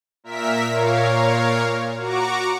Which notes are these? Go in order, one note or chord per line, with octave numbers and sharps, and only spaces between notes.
A#2 A#4 E5 B6
A#2 A#4 C#5 F5
F#4 A#5 C#6 D6